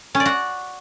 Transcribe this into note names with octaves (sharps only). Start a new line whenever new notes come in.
C#4
D5
F#4